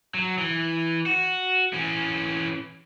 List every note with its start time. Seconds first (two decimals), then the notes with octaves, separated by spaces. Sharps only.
0.14 F#3
0.38 E3
1.06 F#4
1.73 E3 C#4